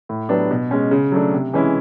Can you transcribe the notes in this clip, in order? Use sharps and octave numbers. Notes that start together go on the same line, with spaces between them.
A2
F#3 B3 D4 G4
B2
G#3 C#4
C#3
F#3 A3 D4
C3
E3 G#3 C#4 E4